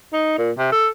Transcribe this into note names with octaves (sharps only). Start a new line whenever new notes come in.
D#4
A#2
C3
A4